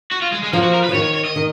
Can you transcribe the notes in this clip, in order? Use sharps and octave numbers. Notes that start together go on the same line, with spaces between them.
F#4
F4
G#3
G#3
F3 A#3
F#4
A#4
B4
F3
D#3 C#5
C#5
C#5
D#5
D#3